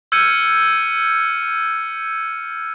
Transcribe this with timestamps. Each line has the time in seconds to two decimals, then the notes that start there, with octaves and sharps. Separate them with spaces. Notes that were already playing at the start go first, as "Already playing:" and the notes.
0.12 E6 F6 G6 G#6 C#7 D#7